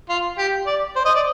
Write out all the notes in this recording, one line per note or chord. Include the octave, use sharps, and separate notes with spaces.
F4
G4
D5
C5
D#5
D5